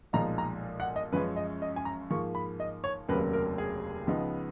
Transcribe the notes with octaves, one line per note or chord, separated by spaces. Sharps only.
B1 A#2 F3 G#3 D#4 A#5
A#5
F#5
D#5
F#2 F3 G#3 C#4 B4
D#5
D#5
G#5
A#5
G#2 F3 A#3 C#6
B5
D#5
C#5
F1 D#2 C#3 F#3 A#3 B4
A#4
G#4
C#2 C#3 F3 B3 D#4